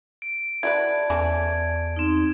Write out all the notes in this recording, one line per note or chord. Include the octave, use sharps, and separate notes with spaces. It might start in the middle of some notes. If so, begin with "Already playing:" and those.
D7
E4 F#4 B4 D5 A5 G#6
E2 E3 C#4 A4
C4 D#4